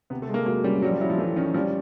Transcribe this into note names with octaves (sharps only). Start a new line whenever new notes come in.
C3 B3
A3
G#3
A#3
F#3 A#3
G3 C#4
F#3 G3
F3
F#3 E4
F3
E3 A3
D#3 C#4
F3 G3